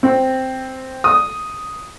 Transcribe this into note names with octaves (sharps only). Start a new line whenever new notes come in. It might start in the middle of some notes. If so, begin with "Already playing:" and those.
C4
D#6